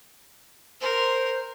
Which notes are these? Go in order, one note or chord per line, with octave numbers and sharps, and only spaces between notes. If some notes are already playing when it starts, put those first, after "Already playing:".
A#4 C5